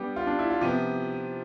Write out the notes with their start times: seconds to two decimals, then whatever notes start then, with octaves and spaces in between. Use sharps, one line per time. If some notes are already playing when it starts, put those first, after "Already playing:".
Already playing: G3 B3 D4 G4
0.16 F4
0.27 D4
0.39 E4
0.50 F4
0.61 C3 F3 B3 G4